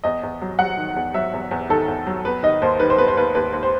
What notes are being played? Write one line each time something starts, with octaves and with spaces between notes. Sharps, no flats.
E2 D#5
E2
F#3
F#3 F#5
D#3
E2
F#3 E5
E2
E2
D#3 A4
E2
F#3
B3 B4
D#3 D#5
D#2 C5
D#3 B4
C5
B3 B4
C5
D#2 B4
D#2 B4
D#2
C5